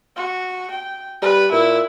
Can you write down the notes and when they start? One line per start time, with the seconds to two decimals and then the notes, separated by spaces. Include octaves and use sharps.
0.16 F#4
0.71 G5
1.22 G3 B4
1.52 A#2 E4